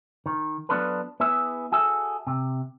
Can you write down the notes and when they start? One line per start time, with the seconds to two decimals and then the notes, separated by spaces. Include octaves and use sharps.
0.26 D#3
0.69 F#3 B3 D4 F4 A4 B4
1.20 B3 E4 G#4 E5
1.72 F#4 G#4 A4 E5
2.27 C3